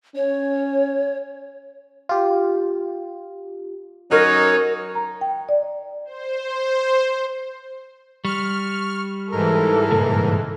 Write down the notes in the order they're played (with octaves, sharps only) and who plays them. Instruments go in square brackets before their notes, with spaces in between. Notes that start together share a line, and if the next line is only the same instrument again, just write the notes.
[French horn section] C#4 [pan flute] C#5
[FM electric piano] F4 G4
[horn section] F#3 C#4 D#4 [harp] A#4 [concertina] C#5
[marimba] A#5
G5
D5
[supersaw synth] C5
[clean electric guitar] G3 [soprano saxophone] C#6 [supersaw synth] F6
[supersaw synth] G#2 E3 [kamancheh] A4 [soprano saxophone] A#4
[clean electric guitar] C#2 G2 A#2